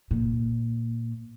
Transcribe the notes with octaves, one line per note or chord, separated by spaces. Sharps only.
A#2